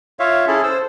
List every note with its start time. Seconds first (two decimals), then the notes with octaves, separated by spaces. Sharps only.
0.20 F4 C#5 E5 F5
0.47 C#4 E4 G#4 A4
0.63 A4 C5 E6